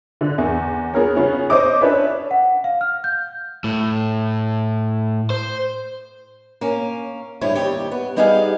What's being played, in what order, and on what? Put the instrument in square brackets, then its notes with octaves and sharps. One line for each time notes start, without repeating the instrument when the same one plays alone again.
[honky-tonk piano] D3
E2
B3 G#4 A#4 C#5
C#3 B3 C#4
C5 C#5 D#5 D6
C#4 D4 A4 B4 C#5 E5
[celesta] F#5
F5
F6
G6
[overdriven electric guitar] A2
C5
[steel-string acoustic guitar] A#3 C#4
D2 G2 E4 C5 C#5
D#2 G3 G4 C#5
B3
G3 B3 D#4 G4 G#4 F5